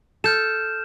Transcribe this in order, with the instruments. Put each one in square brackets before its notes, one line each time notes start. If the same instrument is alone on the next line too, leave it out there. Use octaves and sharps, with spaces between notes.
[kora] A4 [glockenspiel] F6 G6 E7